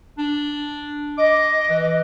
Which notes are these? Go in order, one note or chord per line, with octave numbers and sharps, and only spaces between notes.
D4
D#5 D6
E3